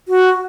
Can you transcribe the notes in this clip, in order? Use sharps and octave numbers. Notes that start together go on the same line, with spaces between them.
F#4